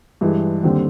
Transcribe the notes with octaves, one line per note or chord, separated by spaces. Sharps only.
G2 E3 G#3
D#2 D3 G3 C4